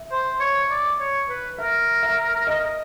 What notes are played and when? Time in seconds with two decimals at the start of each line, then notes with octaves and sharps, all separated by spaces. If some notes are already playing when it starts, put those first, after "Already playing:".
Already playing: E5
0.12 C5
0.40 C#5
0.71 D5
1.00 C#5
1.29 B4
1.58 A#4 E5
2.03 E5
2.47 D#5